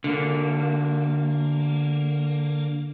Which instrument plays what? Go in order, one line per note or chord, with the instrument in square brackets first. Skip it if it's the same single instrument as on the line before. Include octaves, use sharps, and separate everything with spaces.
[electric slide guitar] D3 A#3